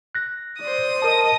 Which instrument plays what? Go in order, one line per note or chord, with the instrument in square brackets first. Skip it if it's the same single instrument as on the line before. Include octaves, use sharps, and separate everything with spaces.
[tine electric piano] F#6 A#6
[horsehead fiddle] C5 D5 [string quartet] D#6
[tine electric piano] A#4 A5 [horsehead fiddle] D#5